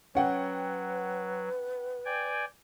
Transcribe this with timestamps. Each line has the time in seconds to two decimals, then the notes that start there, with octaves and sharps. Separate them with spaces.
0.15 F#3 C#4 B4 F#5 G5
2.05 D5 G5 G#5